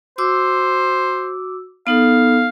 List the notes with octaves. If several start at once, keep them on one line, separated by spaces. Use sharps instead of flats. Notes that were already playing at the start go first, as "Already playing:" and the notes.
F#4 C5 D6 E6
B3 D#4 A4 F5